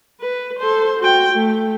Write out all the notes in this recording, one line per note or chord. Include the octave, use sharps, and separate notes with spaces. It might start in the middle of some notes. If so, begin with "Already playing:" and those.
B4
A4 C5
F#4 G5
A3